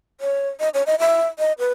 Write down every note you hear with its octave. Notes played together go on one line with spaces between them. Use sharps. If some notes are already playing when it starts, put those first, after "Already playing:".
C#5
D#5
C#5
D#5
E5
D#5
B4